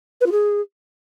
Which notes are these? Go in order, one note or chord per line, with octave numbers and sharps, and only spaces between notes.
B4
F4
G#4